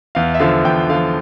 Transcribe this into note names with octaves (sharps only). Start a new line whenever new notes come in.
E2 F5
E5
D3 F3 F5
E2 G5
D3 F3 F5